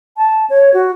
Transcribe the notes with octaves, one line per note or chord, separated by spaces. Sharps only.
A5
C#5
F#4